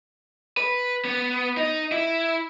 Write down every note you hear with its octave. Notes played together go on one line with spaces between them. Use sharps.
B4
B3
D#4
E4